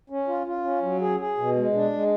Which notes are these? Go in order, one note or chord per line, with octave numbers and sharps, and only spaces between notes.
C#4
F4
F4
C#4
F#3
G#4
G#4
B2
G#3
D4
G#3